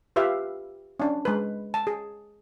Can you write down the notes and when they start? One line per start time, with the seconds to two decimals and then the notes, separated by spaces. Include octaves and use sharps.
0.16 F4 G4 B4 E5 F5
1.00 C#4 D4
1.25 G#3 B4
1.74 A5
1.87 G#4